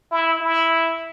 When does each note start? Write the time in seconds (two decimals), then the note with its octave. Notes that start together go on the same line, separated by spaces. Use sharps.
0.11 E4
0.40 E4